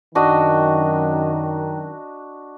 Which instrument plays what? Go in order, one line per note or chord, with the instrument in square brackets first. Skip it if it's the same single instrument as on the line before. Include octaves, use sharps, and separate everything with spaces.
[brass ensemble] F#2 D#3 [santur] D4 F#4 D#5